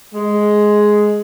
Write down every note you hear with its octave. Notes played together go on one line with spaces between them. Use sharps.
G#3